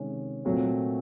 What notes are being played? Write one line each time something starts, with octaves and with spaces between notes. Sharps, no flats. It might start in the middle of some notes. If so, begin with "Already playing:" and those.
Already playing: C3 D#3 G#3 C#4
A#2 F#3 A3 C4